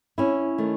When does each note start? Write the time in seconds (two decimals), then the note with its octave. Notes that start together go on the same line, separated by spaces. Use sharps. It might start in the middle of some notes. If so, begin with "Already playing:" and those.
0.18 C#4 E4
0.58 D#3 A3